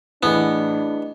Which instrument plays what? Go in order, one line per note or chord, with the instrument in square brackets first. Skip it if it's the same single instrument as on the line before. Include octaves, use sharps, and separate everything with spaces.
[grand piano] A2 E3 [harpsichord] B3 [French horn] D4 [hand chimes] E4 G#4 D#5